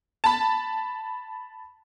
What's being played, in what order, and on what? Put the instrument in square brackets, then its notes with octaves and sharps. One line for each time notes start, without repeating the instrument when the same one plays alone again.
[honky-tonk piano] A5 B5